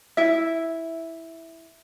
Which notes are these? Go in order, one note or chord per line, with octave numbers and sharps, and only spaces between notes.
E4 E5